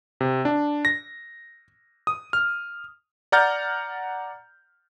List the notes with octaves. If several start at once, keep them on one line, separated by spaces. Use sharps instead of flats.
C3
D4
A#6
D#6
F6
D5 F#5 A#5 F6 G6 A6